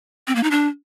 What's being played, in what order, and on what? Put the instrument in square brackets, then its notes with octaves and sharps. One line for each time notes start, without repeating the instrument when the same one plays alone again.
[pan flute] C4
A#3
D#4
D4